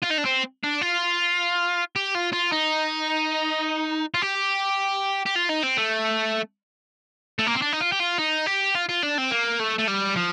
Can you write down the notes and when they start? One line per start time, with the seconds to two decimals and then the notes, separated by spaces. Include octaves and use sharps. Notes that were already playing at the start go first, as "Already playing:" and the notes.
0.03 F4
0.11 D#4
0.18 D4
0.26 C4
0.64 D4
0.82 F4
1.96 G4
2.15 F4
2.33 F4
2.52 D#4
4.14 F4
4.22 G4
5.26 G4
5.36 F4
5.49 D#4
5.63 C4
5.78 A3
7.39 A3
7.47 A#3
7.54 C4
7.62 D4
7.73 D#4
7.81 F4
7.92 G4
8.00 F4
8.18 D#4
8.47 G4
8.75 F4
8.89 F4
9.03 D4
9.18 C4
9.31 A#3
9.60 A3
9.79 A3
9.88 G3
10.16 F3